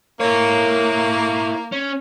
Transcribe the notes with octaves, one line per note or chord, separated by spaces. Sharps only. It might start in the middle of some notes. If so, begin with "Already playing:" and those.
A#3 E4 C#5
C#4